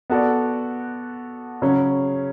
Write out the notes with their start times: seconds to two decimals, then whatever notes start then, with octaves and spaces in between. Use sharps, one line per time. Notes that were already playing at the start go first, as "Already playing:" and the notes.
0.10 B3 F#4 A4 D5
1.62 C#3 F#3 C#4